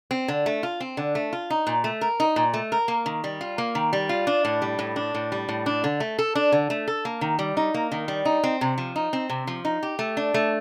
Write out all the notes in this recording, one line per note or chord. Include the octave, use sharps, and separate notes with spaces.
C4
D3
A3
F4
C4
D3
A3
F4
D#4
A#2
A3
A#4
D#4
A#2
A3
A#4
A#3
D#3
G3
F4
A#3
D#3
G3
F4
D4
A2
G3
A2
D4
A2
G3
A2
D4
D3
A3
A4
D4
D3
A3
A4
A#3
D#3
G3
D#4
A#3
D#3
G3
D#4
C4
C3
F3
D#4
C4
C3
F3
D#4
G4
A3
D4
A3